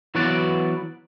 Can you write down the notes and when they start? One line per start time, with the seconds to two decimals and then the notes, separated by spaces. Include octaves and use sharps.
0.15 E3 F#3 B3 F#4 B4 D5